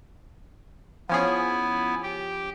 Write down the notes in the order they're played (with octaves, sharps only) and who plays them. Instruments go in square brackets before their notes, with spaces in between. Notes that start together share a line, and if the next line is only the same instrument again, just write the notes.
[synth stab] F3 C#4 G#4 [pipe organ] B3 E4 G#5
[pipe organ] G4 G5